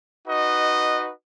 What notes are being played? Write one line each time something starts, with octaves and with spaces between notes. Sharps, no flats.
D#4 F#4 B4 D#5